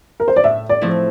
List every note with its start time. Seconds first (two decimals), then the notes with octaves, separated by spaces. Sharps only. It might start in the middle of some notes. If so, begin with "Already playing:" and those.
0.20 A#4
0.28 C5
0.36 D5
0.44 A2 E5
0.69 D5
0.81 F3 A3 C4 E4